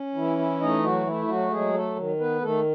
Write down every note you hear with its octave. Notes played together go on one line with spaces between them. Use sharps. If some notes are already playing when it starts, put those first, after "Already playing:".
Already playing: C#4
E3 E4
E4
A3 D#4 D#5
F#3 F#4
A3 E4
F#3 F#4
F#3 G#3 G#4
A3 A4
D#3
B3 B4
D#3 A3 A4